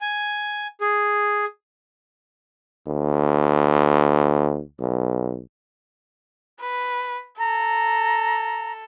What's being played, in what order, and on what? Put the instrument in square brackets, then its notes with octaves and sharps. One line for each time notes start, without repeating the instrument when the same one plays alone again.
[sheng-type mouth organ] G#5
G#4
[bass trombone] D2
B1
[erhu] B4
[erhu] A4 [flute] A#5